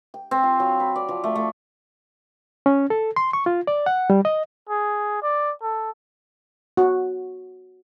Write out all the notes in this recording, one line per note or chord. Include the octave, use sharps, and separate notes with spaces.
G5
C4
F4
F#3
B5
D5
F3
A3
A3
C#4
A4
C6
C#6
F4
D5
F#5
G3
D#5
G#4
D5
A4
F#4